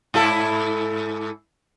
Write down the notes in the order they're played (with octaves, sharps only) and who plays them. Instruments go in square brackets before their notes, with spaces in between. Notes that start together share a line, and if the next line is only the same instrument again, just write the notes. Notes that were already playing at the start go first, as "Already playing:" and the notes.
[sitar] G#2 E4 A4